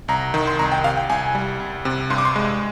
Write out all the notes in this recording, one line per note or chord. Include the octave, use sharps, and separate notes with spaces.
C2 A#5
D#3
C6
C2 A#5
G5
C3 F5
G5
C2 G#5
G3
C2
C3
G2 C6
D6
C6
G#3